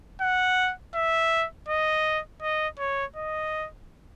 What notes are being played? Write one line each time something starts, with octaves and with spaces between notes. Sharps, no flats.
F#5
E5
D#5
D#5
C#5
D#5